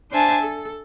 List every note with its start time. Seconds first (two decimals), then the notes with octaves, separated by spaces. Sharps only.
0.11 D4 C5 E5 G#5 A5
0.41 A4